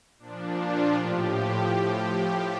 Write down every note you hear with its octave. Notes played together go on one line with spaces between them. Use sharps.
A#2 F3 D4
F4
A2 F3 G4